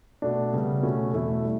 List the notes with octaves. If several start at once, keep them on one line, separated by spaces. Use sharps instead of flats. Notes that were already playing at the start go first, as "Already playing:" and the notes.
B2 A3 D4
C#3 G3 B3
B2 A3 C#4
E2 B2 A3 E4
G3